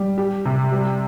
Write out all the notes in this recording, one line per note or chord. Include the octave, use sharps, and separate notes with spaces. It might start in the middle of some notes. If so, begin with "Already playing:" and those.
Already playing: G3
G4
C3
G3